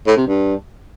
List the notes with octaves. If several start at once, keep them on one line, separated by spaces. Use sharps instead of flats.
A2
C3
G2